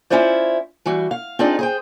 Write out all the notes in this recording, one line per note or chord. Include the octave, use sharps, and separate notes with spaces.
C#4 E4 F4 C5 D5
E3 G3 F#4
F5
C4 D4 D#4 F4 G#4 D5
G#4 C5 G5